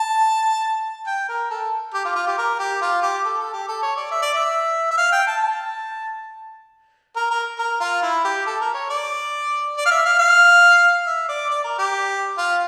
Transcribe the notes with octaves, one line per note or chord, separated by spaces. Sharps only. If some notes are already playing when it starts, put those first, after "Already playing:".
Already playing: A5
G5
A#4
A4
G4
F4
F4
G4
A#4
G4
F4
G4
A4
A4
G4
A4
C#5
D5
E5
D5
E5
E5
F5
G5
A5
A5
A#4
A#4
A#4
F4
E4
G4
A4
A#4
C#5
D5
D5
F5
E5
F5
F5
E5
D5
D5
A#4
G4
F4